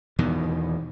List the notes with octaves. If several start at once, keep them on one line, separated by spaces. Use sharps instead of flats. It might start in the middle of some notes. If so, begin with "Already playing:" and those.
E2 B2 D#3